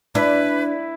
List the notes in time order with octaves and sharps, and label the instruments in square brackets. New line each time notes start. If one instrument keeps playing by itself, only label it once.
[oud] D4 [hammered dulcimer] E4 [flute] B4